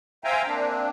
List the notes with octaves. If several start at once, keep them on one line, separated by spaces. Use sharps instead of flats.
C5 E5 F5 G5 G#5 A#5
A#3 C4 D4